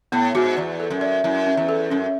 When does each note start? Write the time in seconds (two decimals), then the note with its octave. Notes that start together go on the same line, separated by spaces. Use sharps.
0.12 A2 B3
0.35 G#2 F#4
0.57 E2 D5
0.80 A4
0.90 F#2
1.01 D5
1.24 F#2 E4
1.47 C#4
1.57 E2
1.69 A4
1.90 F#2 C#4